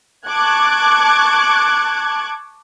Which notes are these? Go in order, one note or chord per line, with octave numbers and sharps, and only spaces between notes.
A5 C#6 D6 F#6 G#6